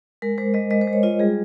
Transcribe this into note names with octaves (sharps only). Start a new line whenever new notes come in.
G#3 A#4
G#3 C5
G#3 D#5
G#3 D#5
C5
G#3
C#5
F4 D#5
G3 G#4